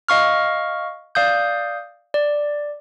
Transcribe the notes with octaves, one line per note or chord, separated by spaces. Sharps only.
D#5 F5 C#6 F6
D5 F5 D#6 G6
D5